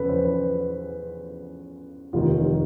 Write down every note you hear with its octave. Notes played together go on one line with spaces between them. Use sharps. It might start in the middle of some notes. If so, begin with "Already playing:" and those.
Already playing: E2 C#3 F3 A4 B4
C5
B4
F1 D#2 D#3 F4